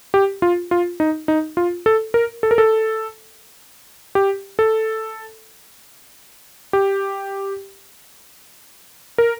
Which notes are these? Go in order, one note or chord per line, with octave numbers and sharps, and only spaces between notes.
G4
F4
F4
D#4
D#4
F4
A4
A#4
A4
A#4
A4
G4
A4
G4
A#4